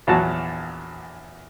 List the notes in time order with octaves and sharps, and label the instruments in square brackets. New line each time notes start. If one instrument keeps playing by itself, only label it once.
[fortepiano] A#1 E2 F#3 F#4 A5